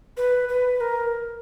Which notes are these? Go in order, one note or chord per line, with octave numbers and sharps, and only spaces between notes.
B4
B4
A#4